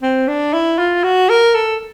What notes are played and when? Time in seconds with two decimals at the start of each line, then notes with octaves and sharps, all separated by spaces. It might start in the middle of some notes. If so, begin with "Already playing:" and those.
0.02 C4
0.28 D4
0.53 E4
0.78 F4
1.04 F#4
1.29 A#4
1.55 A4